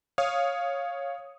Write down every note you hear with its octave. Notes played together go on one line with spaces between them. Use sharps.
C#5 F5 D#6